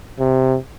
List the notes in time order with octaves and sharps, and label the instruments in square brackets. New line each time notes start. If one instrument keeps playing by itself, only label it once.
[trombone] C3